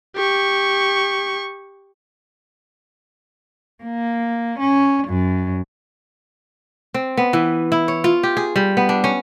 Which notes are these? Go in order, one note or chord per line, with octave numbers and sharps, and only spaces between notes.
G4 C#6
A#3
C#4
F#2
C4
B3
E3
E4
C#5
F4
G4
G#4
G3
B3
D4
C#4